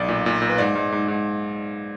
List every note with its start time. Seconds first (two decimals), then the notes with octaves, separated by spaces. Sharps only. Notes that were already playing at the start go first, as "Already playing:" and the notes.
Already playing: B1 D5
0.09 A#2
0.26 A#2
0.42 A#2
0.50 B4
0.58 G#2 D5
0.75 G#2
0.92 G#2
1.08 G#2